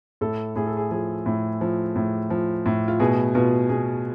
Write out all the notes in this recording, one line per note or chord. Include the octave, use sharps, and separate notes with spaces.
A2 A4
A2 G#4
A4
G#4
F3 G#4
A2
F3
A2
F3
A2
F4
B2 G#4
B2 F4
B2 G#4